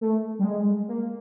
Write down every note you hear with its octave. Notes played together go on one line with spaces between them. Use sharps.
A3
G3
G#3
A#3